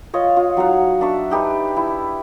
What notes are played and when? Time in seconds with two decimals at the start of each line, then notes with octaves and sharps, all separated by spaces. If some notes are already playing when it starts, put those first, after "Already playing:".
0.14 F4 C#5 D#5
0.37 F4
0.57 F#3 D#4 F5 F#5
1.01 D4 E5 C#6
1.30 D4 D#4 G4 B4
1.76 E4